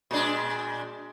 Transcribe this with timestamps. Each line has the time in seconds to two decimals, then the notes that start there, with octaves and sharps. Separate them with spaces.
0.11 A#2 G#3 D4